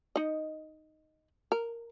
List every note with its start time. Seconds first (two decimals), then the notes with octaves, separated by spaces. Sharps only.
0.16 D#4 D#5
1.52 A#4